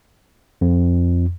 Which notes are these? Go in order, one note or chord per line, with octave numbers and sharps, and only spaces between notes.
F2